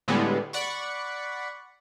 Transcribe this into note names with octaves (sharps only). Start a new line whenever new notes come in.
A2 D3 G3 G#3 B3
D5 F#5 B5 C#6